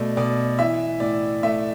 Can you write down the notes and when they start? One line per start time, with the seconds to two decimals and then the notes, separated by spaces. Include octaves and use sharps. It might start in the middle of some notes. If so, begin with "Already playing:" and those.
Already playing: B2 A3 D5
0.17 B2 D5
0.59 E3 E5
1.00 A2 D5
1.43 A3 E5